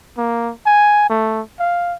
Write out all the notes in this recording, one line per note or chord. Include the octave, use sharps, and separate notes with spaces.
A#3
G#5
A3
F5